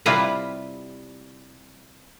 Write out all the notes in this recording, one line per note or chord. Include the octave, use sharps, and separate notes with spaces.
C3 G3 E4 F4 B4 A#5